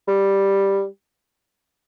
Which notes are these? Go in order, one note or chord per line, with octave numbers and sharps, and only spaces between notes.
G3